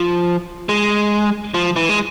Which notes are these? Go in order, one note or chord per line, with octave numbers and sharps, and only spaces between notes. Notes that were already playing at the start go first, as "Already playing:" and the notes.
Already playing: F3
G#3
F3
E3
G#3